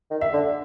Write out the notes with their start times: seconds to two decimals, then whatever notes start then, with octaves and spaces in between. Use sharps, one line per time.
0.11 D#3
0.21 E5
0.33 D3